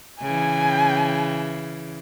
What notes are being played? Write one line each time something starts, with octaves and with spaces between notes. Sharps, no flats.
C#3 E3 G#5